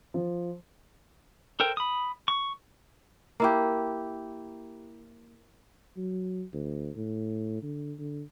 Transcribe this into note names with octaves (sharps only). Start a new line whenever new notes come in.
F3
A4 A#4 C5 G5
B5 D#6
C#6
A#3 E4 G4
F#3
D2
A2
D3
D3